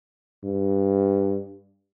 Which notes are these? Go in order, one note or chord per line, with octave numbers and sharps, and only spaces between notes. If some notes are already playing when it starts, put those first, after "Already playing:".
G2